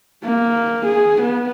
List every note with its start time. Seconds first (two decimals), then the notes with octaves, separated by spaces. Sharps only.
0.24 A#3
0.86 G#4
1.22 B3